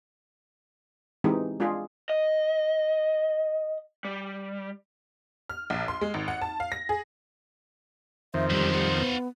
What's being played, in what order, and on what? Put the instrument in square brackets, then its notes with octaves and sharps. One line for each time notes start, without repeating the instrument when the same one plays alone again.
[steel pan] E3 G#3 C4 D#4 G4
G#3 D4 F4 G#4
[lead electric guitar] D#5
G3
[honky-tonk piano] F6
A#1
C6
G#3
G#1
F#5
A5
F5
A#6
G#4
[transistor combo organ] F2 D#3 [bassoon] C5 [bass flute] E5
[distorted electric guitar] F#2 D3 [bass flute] G3
[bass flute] G3 [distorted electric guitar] F4 F#5
[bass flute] B3